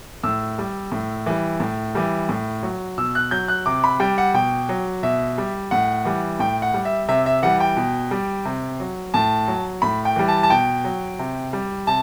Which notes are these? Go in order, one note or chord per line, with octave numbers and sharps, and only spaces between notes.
A2 E6
G3
A2
E3 G3
A2
E3 G3
A2
F#3
B2 E6
F#6
F#3 G6
F#6
C3 D6
B5
G3 G5
F#5
B2 G5
F#3
B2 E5
G3
A2 F#5
E3 G3
A2 G5
F#5
G3
E5
C3 E5
E5
E3 G3 F#5
G5
B2
G3
C3
F#3
A2 A5
F#3
A2 B5
G5
E3 G3
A5
A5
B2 G5
F#3
C3
G3
C3 A5